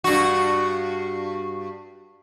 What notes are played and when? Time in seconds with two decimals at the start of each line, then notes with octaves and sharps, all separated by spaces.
0.04 G2 F#4